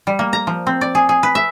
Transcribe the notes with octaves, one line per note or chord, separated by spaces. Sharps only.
G3
A#3
A#5
F3
C4
D5
G#4
G#4
B4
E5